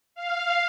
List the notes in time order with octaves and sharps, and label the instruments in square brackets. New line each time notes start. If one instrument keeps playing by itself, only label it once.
[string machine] F5